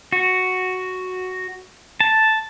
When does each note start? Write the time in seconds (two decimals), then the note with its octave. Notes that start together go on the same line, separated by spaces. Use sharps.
0.12 F#4
2.00 A5